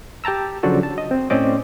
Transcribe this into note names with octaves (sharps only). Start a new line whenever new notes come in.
G4 G5 A5 A#5 E6
C#3 F3 F#3 D4 F#4 A4
A5
D#5
C4
A2 C4 C#4 D5 D#5 D6